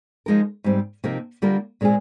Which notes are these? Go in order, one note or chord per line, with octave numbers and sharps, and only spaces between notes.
F3 G#3 D#4 A#4
G#2 G3 C4
C3 F3 A#3 D#4 A#4
D3 G3 A#3 F4 A#4
A#2 G#3 C4 F4 G#4